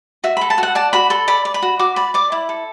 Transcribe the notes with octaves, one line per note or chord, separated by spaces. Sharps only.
F#4 E5
B5
A4
A5
F#4
F#5
D5 A5
F#4 B5
A4 B5
D5 B5
D5
B5
F#4
F#4 D6
D5 B5
D5 D6
E4 B5
A4